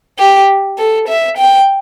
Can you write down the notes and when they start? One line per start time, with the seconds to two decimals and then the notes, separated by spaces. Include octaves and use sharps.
0.19 G4
0.78 A4
1.08 E5
1.37 G5